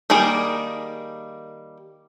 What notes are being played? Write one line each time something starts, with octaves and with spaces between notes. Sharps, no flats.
D#3 G3 A#3 G#4